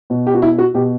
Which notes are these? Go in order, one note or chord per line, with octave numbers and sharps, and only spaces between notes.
B2
G4
F#4
E4
F#4
B2 G4